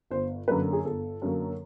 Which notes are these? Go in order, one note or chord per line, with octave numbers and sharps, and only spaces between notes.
G1 C5
F#2 D3 F#3 A#3 B4
G#4
G1 A4
F#2 D3 F#3 A#3